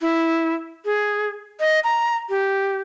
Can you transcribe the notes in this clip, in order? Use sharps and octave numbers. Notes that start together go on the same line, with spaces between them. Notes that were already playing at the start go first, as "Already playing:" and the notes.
E4
G#4
D#5
A#5
G4